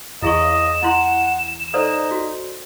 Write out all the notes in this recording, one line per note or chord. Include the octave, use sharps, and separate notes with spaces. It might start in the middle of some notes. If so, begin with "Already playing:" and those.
E2 E4 G#4 D#5 C#6 E7
E4 F#5 C6
D#4 A4 C5 D5
F#4